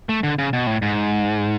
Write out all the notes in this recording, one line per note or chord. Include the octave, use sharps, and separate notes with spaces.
A3
D3
C#3
B2
A2
G#2